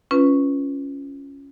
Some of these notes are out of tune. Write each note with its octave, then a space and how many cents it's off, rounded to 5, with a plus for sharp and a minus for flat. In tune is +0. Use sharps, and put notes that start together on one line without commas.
C#4 +0 F4 -15 B4 +5